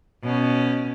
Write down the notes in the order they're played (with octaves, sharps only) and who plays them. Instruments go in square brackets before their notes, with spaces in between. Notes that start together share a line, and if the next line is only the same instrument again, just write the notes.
[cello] B2 C#4